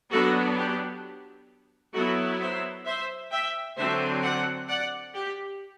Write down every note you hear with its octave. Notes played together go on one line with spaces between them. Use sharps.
F#3 B3 D4 F#4 A4
G4
F#3 B3 E4 F#4 A4
C5 E5
C5 E5
E5 G5
D3 F#3 C4 C5 E5
D5 F#5
D5 F#5
G4